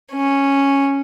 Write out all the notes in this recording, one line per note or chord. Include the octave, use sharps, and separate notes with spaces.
C#4